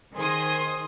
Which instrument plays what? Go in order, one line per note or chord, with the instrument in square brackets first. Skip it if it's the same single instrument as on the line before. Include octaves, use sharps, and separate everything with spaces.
[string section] D#3 G#4 C5 C6 D#6